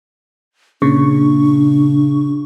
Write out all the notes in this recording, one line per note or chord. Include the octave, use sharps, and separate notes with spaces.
A#2 C#3 D4 C#6